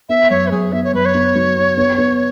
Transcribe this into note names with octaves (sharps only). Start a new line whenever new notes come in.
B3 E5
F#2 C#5
B4
F#2 G#4
B3 E5
C#5
F#2 B4
C#5
B3
F#3
B3
B3
B3